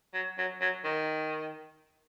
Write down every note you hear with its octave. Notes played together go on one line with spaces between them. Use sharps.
F#3
F#3
F#3
D#3